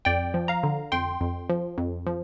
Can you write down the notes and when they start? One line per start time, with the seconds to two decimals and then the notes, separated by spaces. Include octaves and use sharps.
0.05 F2 D5 G5
0.34 F3
0.48 F5 A#5
0.63 D3
0.92 F2 G5 C6
1.21 F2
1.50 F3
1.78 F2
2.07 F3